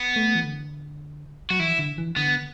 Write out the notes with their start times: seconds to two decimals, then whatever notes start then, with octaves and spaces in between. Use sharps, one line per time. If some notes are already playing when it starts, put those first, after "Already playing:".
Already playing: B3
0.16 A3
0.35 E3
0.44 D3
1.50 F#3 F#4
1.59 E3 E4
1.79 D3
1.98 E3
2.16 D3 B3